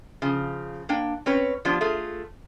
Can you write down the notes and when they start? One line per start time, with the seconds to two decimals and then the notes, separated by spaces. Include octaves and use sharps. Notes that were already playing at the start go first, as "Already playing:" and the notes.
0.22 C#3 F3
0.89 A#3 D4 G5
1.26 C4 C#4 B4 C#5
1.65 F3 B3 D4 F4 G4
1.81 A3 F4 G#4